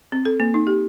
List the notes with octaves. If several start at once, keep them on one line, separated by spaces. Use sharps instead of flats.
C4
A4
A#3
D#4
G4